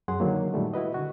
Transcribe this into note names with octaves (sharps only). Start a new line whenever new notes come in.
F#2 F#3 G#4 F#5 C6
D3 D#3 F#3 A#3
A#2 D#3 G3 A3
E4 F#4 B4 D#5
D3 F#4